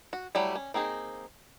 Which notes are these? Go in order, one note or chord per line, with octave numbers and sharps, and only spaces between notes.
F#4
F#3 G3 A3 E4
C#4
A#3 C4 D#4 G#4